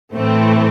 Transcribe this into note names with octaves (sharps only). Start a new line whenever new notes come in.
A2 E3 A3 C4